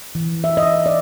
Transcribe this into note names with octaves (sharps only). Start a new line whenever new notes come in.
E3
E5
D#5
D5